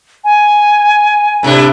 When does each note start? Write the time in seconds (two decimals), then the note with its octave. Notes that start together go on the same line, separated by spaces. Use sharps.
0.24 G#5
1.43 A2 C3 D4